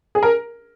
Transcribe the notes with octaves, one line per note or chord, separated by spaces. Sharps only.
G#4
A#4